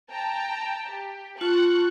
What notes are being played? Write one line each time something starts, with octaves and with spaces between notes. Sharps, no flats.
G5 A5 A#5
G4
F4 A5 C#6 F#6